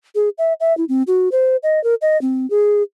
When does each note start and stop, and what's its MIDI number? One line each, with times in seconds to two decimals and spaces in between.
0.15 0.29 68
0.38 0.53 76
0.60 0.75 76
0.77 0.85 64
0.89 1.03 60
1.07 1.29 66
1.32 1.56 72
1.63 1.82 75
1.84 1.95 70
2.02 2.20 75
2.21 2.48 60
2.50 2.83 68